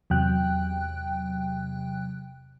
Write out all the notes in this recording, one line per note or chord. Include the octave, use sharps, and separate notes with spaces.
E2 C3 F#3 G5 F#6